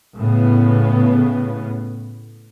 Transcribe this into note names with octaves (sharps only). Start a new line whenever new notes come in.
A2 C#3 B3